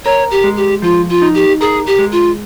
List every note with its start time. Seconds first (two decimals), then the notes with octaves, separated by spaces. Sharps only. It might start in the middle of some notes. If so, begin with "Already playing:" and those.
0.05 A#4 C#5
0.31 G4
0.44 G#3
0.56 G4
0.82 F3 F4
1.09 F4
1.22 D#4
1.34 G4
1.60 G#4 A#4
1.86 G4
1.98 G#3
2.12 F4